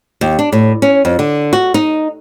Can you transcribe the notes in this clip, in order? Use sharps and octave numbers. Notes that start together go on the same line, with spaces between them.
D#2
D4
A2
C#4
F2
D3
F#4
D#4